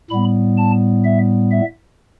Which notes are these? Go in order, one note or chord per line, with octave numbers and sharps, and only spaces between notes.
A2 G3 B3 B5
A5
E5
E5